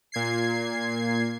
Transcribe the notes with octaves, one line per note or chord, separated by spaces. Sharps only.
A#2 G#6 C7